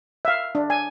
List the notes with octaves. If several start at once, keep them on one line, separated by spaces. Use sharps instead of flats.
E5 F5
D4
G#5